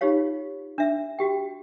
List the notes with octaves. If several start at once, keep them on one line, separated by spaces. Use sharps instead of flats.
D#4 F4 G4 C#5 F5
D4 E5
F#4 G4 G5